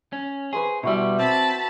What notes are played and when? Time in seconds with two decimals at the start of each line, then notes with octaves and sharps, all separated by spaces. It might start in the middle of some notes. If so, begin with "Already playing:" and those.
0.13 C#4
0.53 G#4 B4 C5 C#6
0.83 B2 G3 E4 F#4 E5
1.19 C4 A5 B5